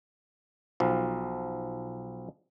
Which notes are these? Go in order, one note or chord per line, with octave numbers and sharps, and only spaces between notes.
B1 F3